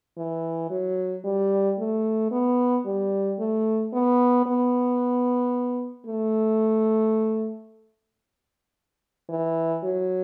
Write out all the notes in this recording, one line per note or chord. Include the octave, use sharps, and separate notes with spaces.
E3
F#3
G3
A3
B3
G3
A3
B3
B3
A3
E3
F#3